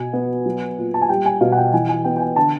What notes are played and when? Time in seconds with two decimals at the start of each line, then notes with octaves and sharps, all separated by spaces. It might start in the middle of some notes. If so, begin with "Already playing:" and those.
Already playing: B2 G#5
0.13 B3
0.46 F#3
0.78 A#2
0.94 A5
1.01 G#5
1.09 G3 G5
1.26 G#5
1.41 B2 F5
1.52 F#5
1.58 G5
1.73 E3 G#5
1.89 G#5
2.04 B3 G5
2.17 G5
2.20 G#5
2.36 D3 A5